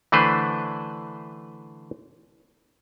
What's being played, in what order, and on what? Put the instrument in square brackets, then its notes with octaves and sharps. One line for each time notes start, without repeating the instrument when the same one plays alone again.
[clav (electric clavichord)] D3 E3 A3 D4 B4 C5